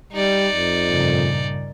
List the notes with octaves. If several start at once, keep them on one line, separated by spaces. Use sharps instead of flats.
G3 D#4 D5
F2
G2 A#2 C#3